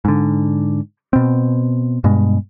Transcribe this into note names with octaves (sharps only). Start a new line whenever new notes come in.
G#2 D3
B2 C4
G2 B2 G#3